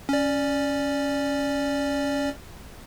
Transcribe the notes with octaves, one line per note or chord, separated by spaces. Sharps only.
C#4 D5